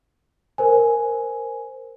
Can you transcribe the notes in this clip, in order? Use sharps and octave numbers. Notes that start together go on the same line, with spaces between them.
A#4 C5 G#5